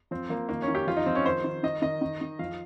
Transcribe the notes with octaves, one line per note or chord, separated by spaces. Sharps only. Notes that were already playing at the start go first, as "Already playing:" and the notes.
F3 C4
F3 A#3
D#3 A#3
C#4
D#3
G4
F3 F4
D#4
F3 C4
C#4
D#3 C5
D#3
D#3 D#5
D#3 D#5
D#3
D#3
F3 F5